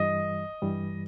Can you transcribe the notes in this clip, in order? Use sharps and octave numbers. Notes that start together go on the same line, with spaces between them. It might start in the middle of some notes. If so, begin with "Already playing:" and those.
Already playing: G2 E3 G3 D#5
G2 E3 G3